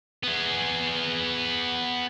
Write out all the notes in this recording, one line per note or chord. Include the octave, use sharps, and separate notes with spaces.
B3 G#4